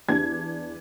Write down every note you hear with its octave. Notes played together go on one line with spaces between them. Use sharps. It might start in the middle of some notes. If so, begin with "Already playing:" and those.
E2 D4 G#6